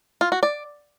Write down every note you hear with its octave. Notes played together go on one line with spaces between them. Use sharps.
F4
F#4
D5